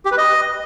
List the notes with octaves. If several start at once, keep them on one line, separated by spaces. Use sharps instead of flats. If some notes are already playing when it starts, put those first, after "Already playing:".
G4
B4
D#5